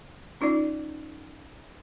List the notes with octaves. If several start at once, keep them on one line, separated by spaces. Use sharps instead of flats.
C#4 D#4 F4 D5